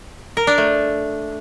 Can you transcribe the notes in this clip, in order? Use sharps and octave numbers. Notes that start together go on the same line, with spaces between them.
A#4
D4
A3